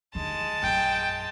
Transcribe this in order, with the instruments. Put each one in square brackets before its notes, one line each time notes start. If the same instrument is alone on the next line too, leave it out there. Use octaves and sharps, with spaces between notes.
[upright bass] D#2 D3 [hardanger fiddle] G#3 A5
[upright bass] A#1 F#2 [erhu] G5